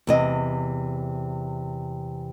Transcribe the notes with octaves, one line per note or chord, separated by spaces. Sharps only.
E2 C3 D#5